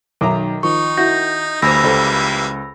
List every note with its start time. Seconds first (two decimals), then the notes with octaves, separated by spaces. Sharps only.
0.21 B1 D#3 E5 A#5 D6
0.63 D#3 F3 D#4 C#6
0.97 E4 F#4 G6 A#6
1.62 D2 E3 G3 A#3 C5 B5 E6 A#6
1.84 C#2 A4 C5